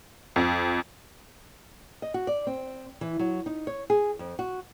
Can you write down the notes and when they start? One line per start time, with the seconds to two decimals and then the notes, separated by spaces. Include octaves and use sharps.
0.36 F2
2.02 D#5
2.14 F#4
2.27 D5
2.47 C4
3.01 E3
3.19 F#3
3.46 D#4
3.67 C#5
3.90 G#4
4.19 F2
4.39 F#4